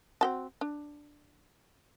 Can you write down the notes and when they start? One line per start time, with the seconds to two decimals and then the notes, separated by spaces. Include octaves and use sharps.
0.21 C4 F#4 A5
0.61 D4